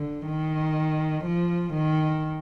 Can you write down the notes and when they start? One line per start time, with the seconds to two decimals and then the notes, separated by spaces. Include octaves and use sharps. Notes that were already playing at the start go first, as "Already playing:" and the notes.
Already playing: D3
0.27 D#3
1.25 F3
1.74 D#3